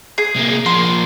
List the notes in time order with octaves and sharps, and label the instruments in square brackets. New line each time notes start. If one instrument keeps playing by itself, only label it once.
[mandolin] G#4
[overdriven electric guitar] C3 A#3
[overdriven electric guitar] F3 A#3 [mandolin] C6